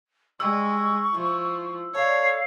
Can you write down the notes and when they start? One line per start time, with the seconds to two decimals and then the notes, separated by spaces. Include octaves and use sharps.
0.40 G3 G#3 D#4 C#6 E6
1.14 F3 E4
1.95 A4 C#5 D5 F5